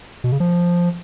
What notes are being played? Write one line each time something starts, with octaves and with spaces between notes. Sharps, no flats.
B2
C#3
F3